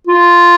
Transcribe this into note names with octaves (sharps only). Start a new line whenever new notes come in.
F4